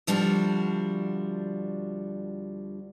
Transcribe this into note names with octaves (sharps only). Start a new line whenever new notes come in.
D2 F3 G3 D4 F#4